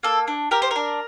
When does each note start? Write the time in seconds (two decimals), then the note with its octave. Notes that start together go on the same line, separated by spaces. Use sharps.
0.03 A#3 A4
0.28 D4
0.51 G4 A#4
0.62 C5
0.71 D4 A#4